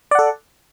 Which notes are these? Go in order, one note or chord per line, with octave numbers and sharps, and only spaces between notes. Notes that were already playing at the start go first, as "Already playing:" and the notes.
A4 D5 F#5